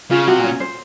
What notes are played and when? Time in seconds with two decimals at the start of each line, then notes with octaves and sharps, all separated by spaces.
0.11 C#3 F4
0.27 C3 F#4
0.39 A#2
0.44 C#4
0.60 C5